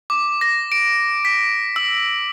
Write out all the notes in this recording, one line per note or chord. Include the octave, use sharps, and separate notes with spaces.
D6
A#6
D7
B6
E6